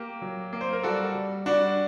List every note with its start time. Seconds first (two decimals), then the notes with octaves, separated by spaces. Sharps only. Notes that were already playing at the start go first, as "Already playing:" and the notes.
Already playing: A#3 G4
0.22 F#3
0.53 A#3
0.61 C5
0.73 A#4
0.83 G3 F#4 A4
1.15 G3
1.46 G3 D4 F#4